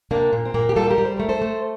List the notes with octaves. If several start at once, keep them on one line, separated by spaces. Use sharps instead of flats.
C3 A#3 D4
A#2
C4
A#2 A#3
G4
G3 F4 A4
G4 A#4
G3
C5
A3 A#4
A4 C5
A3